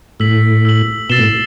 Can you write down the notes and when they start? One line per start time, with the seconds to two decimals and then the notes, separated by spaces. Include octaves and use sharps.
0.20 A2 E6 B6 F#7
0.65 E6 B6 F#7
1.10 B2 E6 A6 C7 E7 G7
1.19 A2